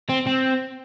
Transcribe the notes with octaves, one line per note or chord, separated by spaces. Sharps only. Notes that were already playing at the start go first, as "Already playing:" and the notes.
C4
C4